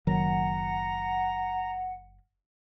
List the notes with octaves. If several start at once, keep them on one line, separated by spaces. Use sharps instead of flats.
F#1 D#3 F#3 F#5 A#5